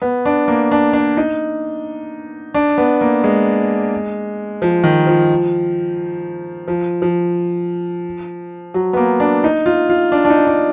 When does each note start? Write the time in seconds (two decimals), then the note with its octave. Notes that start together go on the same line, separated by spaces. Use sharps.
0.02 B3
0.25 D4
0.48 A#3
0.71 D4
0.93 D4
1.17 D#4
2.54 D4
2.78 B3
3.01 A#3
3.24 G#3
4.62 F3
4.84 D#3
5.07 F3
6.68 F3
7.02 F3
8.74 F#3
8.93 B3
8.97 A#3
9.20 D4
9.44 D#4
9.66 F4
9.89 F4
10.12 D4
10.25 D4
10.30 D#4
10.47 D4